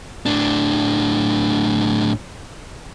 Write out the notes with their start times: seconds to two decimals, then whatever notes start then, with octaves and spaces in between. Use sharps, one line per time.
0.26 A2 D4